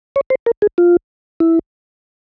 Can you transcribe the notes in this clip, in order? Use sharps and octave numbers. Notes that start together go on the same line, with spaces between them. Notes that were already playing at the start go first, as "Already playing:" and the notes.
C#5
C5
A#4
G#4
F4
E4